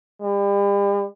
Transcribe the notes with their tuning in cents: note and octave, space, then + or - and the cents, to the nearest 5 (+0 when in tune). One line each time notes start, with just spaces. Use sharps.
G3 +40